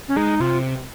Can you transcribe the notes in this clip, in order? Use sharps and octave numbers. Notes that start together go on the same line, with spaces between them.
C#4
G#3 D#4
C3 F4